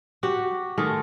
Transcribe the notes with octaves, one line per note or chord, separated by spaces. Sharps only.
F#4 G4 F#5
D#3 G#3 A3